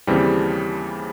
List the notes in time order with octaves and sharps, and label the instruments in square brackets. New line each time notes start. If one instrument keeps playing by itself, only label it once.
[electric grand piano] D#2 C#3 E3 G3 C4